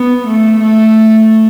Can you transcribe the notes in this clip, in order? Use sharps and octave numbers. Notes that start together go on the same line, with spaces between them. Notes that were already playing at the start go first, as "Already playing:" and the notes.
Already playing: B3
A3
A3